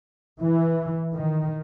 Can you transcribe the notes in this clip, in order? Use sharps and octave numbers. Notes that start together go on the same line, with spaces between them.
E3
D#3